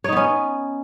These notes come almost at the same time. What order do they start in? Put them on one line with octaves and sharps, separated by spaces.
C#5 D#4 B3 C#4